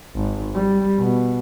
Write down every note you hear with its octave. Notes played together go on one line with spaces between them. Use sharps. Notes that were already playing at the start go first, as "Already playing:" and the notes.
G#1
G3
B2